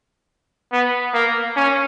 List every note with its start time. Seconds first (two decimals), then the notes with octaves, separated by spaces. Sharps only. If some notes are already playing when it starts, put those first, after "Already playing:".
0.73 B3
1.14 A#3
1.57 C#4